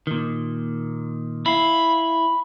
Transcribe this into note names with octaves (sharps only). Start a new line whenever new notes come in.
A#2 D#3
E4 F5 B5